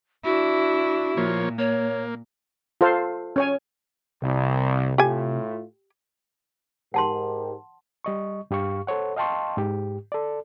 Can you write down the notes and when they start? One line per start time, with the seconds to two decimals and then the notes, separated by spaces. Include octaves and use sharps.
0.24 D4 E4 F#4
1.17 A#2 F3 A#3 C#5
1.58 A#3 C#5
2.81 F4 A4 C5 F5
3.36 C#4 C#5 G#5
4.22 C2 C3
4.98 A2 A3 F4 G4 G#5
6.94 G#2 G4 A#4 F#5 A5 C6
8.04 G3 D#5 C#6
8.51 G2 G4 F5 C#6
8.87 A4 C5 C#5 F#5
9.16 D#5 F5 G5 A5 C6 C#6
9.57 G#2 G4
10.12 A4 D5